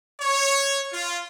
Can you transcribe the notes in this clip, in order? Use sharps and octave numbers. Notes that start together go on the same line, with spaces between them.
C#5
F4